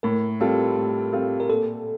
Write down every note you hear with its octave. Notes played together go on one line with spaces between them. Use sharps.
A2 A#4
G3 C4 F4 A4
A2
G3 C4 F4 A4
A#4
A#2 A4